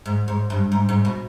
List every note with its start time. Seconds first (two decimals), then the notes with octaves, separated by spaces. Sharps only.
0.06 G#2
0.28 G#2
0.50 G2
0.72 G#2
0.89 G#2
1.05 B2